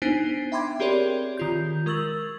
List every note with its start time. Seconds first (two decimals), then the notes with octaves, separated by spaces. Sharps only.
0.02 B3 D4 D#4 C5 G#5 C7
0.52 E5 G5 B5 C6 D6 G#6
0.80 C4 G4 G#4 A#4 C#5 D5
1.37 D#3 F4 G6
1.86 G#3 A#4 C#6 E6 A6 F#7